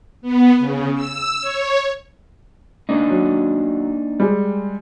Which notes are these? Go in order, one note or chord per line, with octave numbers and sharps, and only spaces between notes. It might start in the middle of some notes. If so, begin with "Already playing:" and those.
B3
C#3
E6
C#5
A#3 D4 D#4
F#3
G3 G#3